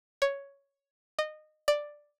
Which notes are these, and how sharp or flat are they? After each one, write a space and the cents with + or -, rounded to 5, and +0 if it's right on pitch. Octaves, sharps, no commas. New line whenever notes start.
C#5 +5
D#5 -20
D5 +5